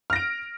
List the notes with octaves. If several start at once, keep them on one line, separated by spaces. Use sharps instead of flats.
F6 A#6 D7